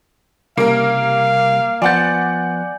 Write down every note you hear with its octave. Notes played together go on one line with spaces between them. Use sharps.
C2 C#3 G3 A#3 A#4 F5
F3 B3 D5 F#5 G#5 G6 A6